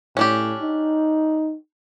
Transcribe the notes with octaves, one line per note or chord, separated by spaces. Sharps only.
A2 C#4 D4 G4
D#4